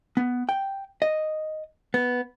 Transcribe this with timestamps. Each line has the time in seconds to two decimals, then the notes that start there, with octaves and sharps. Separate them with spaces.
0.17 B3
0.49 G5
1.02 D#5
1.94 B3